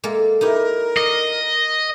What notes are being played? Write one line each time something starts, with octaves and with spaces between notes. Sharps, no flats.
G#3 A#3 A4
D#4 E4 G4 A#4
D5 D#5